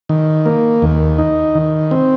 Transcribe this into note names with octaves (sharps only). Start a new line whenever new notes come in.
D#3
A#3
D#2
D#4
D#3
C4